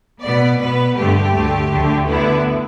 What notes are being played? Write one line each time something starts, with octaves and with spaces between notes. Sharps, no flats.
B2 B3 D5
B2 B3 B4
G2 D3 A3 G4
D2 D3 A3
D2 D3 A3
D2 D3 B3 E4